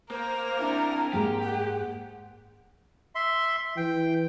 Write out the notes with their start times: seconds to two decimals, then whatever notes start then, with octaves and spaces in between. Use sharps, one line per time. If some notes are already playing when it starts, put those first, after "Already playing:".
0.11 A#3 A#4 C5
0.60 C3 D4 E4
1.13 G#2 G#3 A#3 G4
1.43 F#5
3.15 E5 C6
3.77 E3 G5